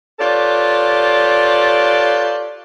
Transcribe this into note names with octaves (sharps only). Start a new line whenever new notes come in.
F4 G4 A4 B4 C#5 D5